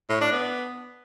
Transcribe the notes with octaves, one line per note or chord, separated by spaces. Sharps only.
A2
D4
B3